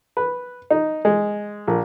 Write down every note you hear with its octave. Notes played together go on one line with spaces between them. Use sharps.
B4
D#4
G#3
A#1